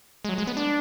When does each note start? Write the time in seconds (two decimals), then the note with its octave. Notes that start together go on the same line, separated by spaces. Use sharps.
0.25 G#3
0.29 F#3
0.38 G#3
0.47 B3
0.57 D4